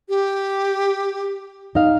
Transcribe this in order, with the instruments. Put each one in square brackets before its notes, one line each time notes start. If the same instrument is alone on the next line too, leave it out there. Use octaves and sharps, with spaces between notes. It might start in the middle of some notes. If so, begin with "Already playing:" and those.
[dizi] G4
[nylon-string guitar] D#4 F5